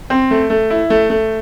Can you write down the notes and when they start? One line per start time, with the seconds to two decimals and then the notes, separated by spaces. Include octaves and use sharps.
0.10 C4
0.31 A3
0.50 A3
0.70 E4
0.90 A3
1.10 A3